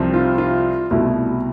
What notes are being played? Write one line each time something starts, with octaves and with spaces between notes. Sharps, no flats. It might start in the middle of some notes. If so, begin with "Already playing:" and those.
Already playing: C2 C3 F3
F4
F4
C2 B2 A3 E4